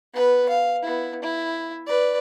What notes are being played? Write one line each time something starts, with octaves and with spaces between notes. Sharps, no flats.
B3 B4
F5
B3 E4
E4
B4 D5